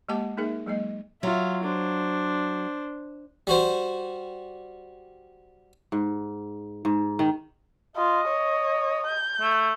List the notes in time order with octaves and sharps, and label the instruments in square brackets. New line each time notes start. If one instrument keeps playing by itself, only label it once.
[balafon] G#3 A#3 G4 F#5 A5 D6
A#3 D#4 G#4 A#4 E5
F#3 G#3 A#3 D#5
[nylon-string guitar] F#3 [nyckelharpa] F4 E5
[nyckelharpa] D4 C5
[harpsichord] G3 F#4 C5
[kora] G#2
G#2
D#3
[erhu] F4 [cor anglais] D#5
[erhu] C#5
G6
[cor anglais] A3